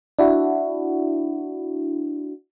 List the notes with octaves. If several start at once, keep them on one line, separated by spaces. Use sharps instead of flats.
D4 E4 F#4